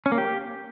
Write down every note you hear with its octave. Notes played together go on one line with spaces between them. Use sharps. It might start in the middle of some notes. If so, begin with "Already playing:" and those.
C#4
A#3
G4